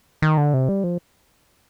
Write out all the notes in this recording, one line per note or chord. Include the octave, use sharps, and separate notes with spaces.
D#3
D3
C3
G3
F3